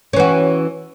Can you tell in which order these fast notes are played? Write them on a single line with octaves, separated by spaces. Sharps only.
C#4 E3 F#4